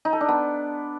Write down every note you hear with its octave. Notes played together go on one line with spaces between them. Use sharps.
D#4
A4
D4
B3